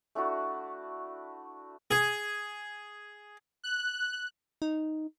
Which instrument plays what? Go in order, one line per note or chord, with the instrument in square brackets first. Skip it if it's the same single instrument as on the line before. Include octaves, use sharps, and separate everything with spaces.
[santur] A3 D4 E4 F#4
[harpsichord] G#4
[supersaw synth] F#6
[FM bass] D#4